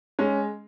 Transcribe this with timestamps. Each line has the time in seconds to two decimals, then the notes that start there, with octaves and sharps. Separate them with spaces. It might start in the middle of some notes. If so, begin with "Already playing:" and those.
0.19 G#3 C#4